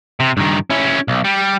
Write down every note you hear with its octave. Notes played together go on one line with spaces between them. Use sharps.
C3
G2 D#3
C#4 E4
B1
G3